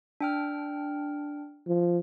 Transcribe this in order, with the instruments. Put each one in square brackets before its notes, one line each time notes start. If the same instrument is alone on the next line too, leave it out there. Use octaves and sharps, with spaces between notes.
[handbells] D4 G5 F6
[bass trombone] F3